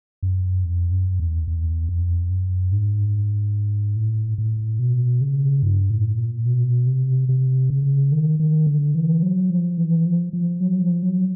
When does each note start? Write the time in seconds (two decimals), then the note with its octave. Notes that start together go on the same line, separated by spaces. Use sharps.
0.23 F#2
0.64 F2
0.91 F#2
1.19 E2
1.47 E2
1.89 F2
2.30 F#2
2.72 G#2
3.96 A2
4.38 A2
4.79 B2
5.21 C#3
5.63 G2
5.90 A2
6.17 A#2
6.46 B2
6.87 C3
7.29 C3
7.70 C#3
8.12 D#3
8.40 D#3
8.67 D3
8.95 E3
9.23 F#3
9.50 F3
9.78 E3
10.06 F3
10.33 F3
10.61 F#3
10.82 F3
11.03 F#3